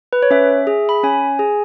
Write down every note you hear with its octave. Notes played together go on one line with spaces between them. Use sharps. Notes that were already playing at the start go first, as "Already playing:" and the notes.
B4
C#5
C#4 E5
G#4
B5
C#4 G#5
G#4